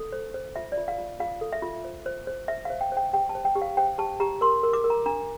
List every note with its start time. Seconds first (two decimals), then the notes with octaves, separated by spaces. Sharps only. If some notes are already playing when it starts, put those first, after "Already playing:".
Already playing: A4
0.13 C5
0.34 C5
0.56 F4 E5
0.72 D5
0.77 F4
0.88 F5
0.98 F4
1.20 F4 F5
1.41 A4
1.53 E5
1.62 F4
1.85 C5
2.06 C5
2.27 C5
2.48 C5 E5
2.65 C5 F5
2.81 G5
2.92 C5 G5
3.13 G4 G5
3.29 A5
3.35 C5
3.45 G5
3.55 G4
3.62 F5
3.77 C5 G5
3.98 G4 A5
4.20 G4 A#5
4.41 A#4 C6
4.63 A#4
4.73 D6
4.84 A#4
4.90 A#5
5.06 D4 A#5